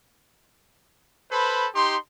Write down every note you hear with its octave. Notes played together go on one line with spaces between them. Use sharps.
A4 B4 C5 B5
D#4 G4 C6